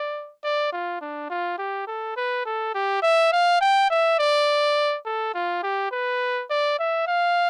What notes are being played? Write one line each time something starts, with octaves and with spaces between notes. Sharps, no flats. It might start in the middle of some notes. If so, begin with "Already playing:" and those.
Already playing: D5
D5
F4
D4
F4
G4
A4
B4
A4
G4
E5
F5
G5
E5
D5
A4
F4
G4
B4
D5
E5
F5